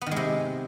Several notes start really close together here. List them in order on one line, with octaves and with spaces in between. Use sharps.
B3 D#3 G#3 C3